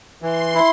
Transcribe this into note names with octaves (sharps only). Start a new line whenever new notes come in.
E3 C6
E4